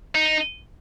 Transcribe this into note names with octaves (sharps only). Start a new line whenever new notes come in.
D#4